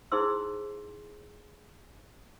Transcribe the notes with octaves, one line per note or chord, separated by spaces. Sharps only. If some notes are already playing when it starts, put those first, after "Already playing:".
D#4 E4 G#4 C5 C6 E6